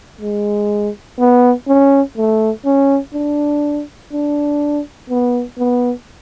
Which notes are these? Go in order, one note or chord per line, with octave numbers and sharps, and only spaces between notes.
G#3
B3
C#4
A3
C#4
D4
D4
B3
B3